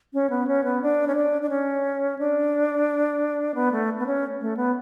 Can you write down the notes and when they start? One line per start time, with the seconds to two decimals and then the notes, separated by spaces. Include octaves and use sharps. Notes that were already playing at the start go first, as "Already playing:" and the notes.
0.14 C#4
0.30 B3
0.47 C#4
0.64 B3
0.82 D4
1.07 C#4
1.15 D4
1.42 D4
1.49 C#4
2.19 D4
3.55 B3
3.72 A3
3.99 B3
4.07 C#4
4.41 A3
4.57 B3